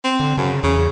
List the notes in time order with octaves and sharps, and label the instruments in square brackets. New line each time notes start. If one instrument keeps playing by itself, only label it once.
[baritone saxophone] C4
[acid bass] D3
[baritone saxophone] F#2 [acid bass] C#3
[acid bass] E2 [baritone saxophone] C#3